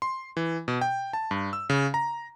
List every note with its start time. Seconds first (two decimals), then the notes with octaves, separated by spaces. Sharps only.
0.02 C6
0.37 E3
0.68 B2
0.81 G5
1.13 A5
1.31 G2
1.53 E6
1.70 C#3
1.94 A#5